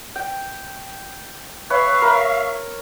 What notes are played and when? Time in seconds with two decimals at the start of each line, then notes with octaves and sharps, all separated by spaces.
0.16 G5
1.70 B4 C#5 E5 F5 C#6
2.02 A#4